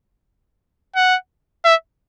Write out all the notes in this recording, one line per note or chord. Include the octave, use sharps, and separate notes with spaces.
F#5
E5